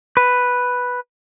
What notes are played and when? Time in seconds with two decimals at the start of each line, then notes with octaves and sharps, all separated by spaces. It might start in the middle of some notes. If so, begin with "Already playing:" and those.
0.17 B4